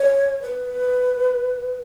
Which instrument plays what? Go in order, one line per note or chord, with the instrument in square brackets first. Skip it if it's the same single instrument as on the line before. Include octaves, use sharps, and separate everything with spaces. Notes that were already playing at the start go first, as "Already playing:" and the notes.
Already playing: [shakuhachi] C#5
B4